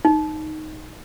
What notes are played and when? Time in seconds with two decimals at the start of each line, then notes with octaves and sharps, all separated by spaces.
0.05 D#4